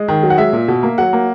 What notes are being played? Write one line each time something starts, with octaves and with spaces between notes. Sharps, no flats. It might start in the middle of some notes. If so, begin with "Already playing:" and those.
Already playing: G#3 D#5
D#3
F#3
F#5
G#3 E5
A#2
B2
A#3
F#3 F#5
A#3